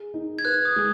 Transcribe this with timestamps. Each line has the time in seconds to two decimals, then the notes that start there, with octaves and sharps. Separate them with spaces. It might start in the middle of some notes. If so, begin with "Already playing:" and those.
Already playing: G#4
0.14 D#4
0.39 G#6
0.45 B4 F#6
0.65 D#6
0.76 G#3